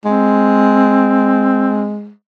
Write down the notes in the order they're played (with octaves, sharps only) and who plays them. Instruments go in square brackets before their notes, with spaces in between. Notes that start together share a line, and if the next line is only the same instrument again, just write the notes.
[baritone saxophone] G#3 [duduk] C4